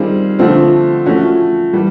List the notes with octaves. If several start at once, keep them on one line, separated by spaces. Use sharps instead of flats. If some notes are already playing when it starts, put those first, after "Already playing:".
Already playing: D#3 G3 C4 F4 G#4
D3 F3 A3 C4 F4
F3 A3 C#4 F#4
E3 G3